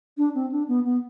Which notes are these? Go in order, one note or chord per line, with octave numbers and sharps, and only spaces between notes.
D4
C4
D4
B3
B3